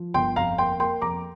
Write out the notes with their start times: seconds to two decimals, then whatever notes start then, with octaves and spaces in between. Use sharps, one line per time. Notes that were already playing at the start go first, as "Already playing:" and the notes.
Already playing: F3
0.14 G1 G5 C6
0.36 F2 F5 A#5
0.58 A#3 G5 C6
0.80 A#3 G5 C6
1.02 F2 A#5 D6